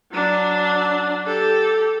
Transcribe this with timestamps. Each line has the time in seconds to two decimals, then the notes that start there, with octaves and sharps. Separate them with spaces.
0.12 F#3 D4
1.25 G4 A4